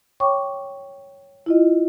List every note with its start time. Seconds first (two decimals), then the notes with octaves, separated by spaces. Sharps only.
0.20 C#5 G5 C#6 D6
1.46 E4 F4 D#5